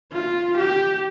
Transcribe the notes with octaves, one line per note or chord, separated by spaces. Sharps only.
F4
G4